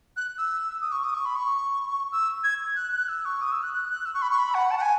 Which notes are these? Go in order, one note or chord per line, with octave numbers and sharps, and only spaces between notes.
F#6
E6
D#6
C#6
D#6
C#6
B5
C#6
E6
G#6
F#6
F#6
E6
C#6
D#6
E6
F#6
F#6
F#6
E6
C#6
B5
C#6
B5
F#5
A5
F#5
G#5